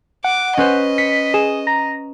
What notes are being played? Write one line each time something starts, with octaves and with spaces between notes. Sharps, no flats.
F#5 D6
C#4 B4 C5 D#5
B6 C#7
G#4 E7
A#5